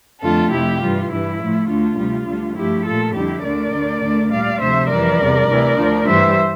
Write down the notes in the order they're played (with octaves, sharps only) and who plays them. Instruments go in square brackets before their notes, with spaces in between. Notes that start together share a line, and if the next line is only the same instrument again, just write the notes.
[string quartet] F2 D3 A3 F4 A4
F2 C3 F3 A3 E4 G4
G2 E3 G3 F4
G2 E3 G3 E4
A2 F3 A3
D2 D3 A3 F4
D2 C3 G3
D2 D3 G3
G2 F3 A3 E4 G4
A#2 A3 F4 A4
F2 D3 G3 E4 G4
D2 D3 A3 A#4 D5
D2 D3 A3
D2 D3 A3
A#2 G3 D5 F5
D2 C3 F3 A3 C5 E5
F2 E3 G3 A#4 D5
E2 C3 G3
D2 C3 E3
D2 D3 F3
G2 E3 G3 C5 E5